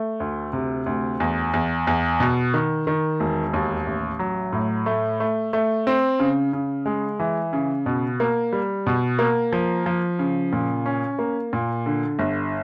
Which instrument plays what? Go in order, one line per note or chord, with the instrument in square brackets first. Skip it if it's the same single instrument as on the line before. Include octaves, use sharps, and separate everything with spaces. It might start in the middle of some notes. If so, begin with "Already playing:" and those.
Already playing: [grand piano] A3
D2
C3
D2
E2
E2
E2
B2
D#3
D#3
E1
D#2
A1
F#3
A2
A3
A3
A3
C4
C#3
C#3
G#3
E3
C#3
B2
A#3
G3
B2
A#3
F3
F3
C#3
A#2
C#4
A#3
A#2
D3
G1